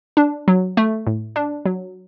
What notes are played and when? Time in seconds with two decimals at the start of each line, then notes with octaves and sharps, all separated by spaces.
0.17 D4
0.48 F#3
0.77 A3
1.07 A2
1.36 D4
1.65 F#3